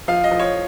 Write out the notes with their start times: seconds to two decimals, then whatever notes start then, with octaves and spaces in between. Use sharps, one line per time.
0.08 F3 F5
0.24 D#5
0.31 F3
0.39 C#5